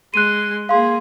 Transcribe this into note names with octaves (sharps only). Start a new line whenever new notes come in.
G#3 C6 F#6 D#7
A#3 G#4 F5 C6